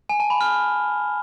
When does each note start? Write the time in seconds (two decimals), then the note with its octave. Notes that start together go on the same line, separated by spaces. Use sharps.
0.09 G#5
0.20 A5
0.30 B5
0.41 F6